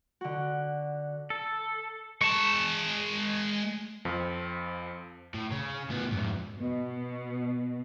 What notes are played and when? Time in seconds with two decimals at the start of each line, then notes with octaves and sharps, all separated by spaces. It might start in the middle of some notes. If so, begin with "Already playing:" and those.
0.21 D3 F#4
1.30 A4
2.21 G#3 A5 C#6
4.05 F2 F3 C4
5.35 A2
5.52 C#3
5.90 A2 B3
6.12 F2 G#2
6.60 B2